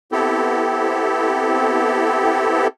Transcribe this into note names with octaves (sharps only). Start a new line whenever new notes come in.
B3 C4 E4 G4 A4